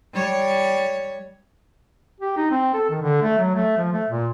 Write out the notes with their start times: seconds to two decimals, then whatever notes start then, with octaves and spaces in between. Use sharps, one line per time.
0.13 G3 C#5
2.20 G4
2.37 D#4
2.51 C4
2.74 A4
2.90 D#3
3.02 D3
3.22 A3
3.38 F#3
3.55 A3
3.77 F3
3.93 A3
4.09 A#2